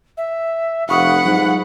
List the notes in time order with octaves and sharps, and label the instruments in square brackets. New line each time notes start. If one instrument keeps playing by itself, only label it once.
[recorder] E5
[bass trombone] F1 [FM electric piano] F5 C#6 D#6 [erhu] F#5 [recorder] B5
[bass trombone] G#2 [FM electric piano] F#3